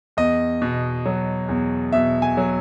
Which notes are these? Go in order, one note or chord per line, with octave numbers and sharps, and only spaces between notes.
E2 D#5
B2
F#3
E2
B2 E5
G#5
F#3